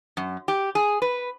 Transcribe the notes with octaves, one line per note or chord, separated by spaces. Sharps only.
F#2
G4
G#4
B4